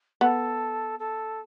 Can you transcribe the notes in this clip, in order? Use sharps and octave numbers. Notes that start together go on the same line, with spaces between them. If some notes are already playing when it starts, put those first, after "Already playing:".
B3 A4
A4